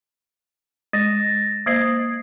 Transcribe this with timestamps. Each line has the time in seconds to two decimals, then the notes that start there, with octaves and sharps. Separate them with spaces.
0.93 G#3 A6 A#6
1.66 A#3 C5 D#5 D#6 G#6 C7